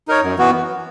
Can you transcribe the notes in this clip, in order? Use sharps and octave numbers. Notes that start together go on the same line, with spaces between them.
D#4 A#4 C#5
F#2
E3 B3 F#4